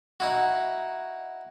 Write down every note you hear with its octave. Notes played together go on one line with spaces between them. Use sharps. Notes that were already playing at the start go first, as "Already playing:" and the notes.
D#4 E4 F#4